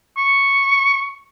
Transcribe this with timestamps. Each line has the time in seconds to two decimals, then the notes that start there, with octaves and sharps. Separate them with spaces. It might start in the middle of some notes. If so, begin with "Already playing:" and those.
0.17 C#6